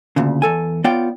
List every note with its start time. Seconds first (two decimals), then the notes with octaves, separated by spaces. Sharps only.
0.16 D2 A#2 C#3
0.42 E2 A4 G#5
0.84 B3 F4 C#5 D5 G5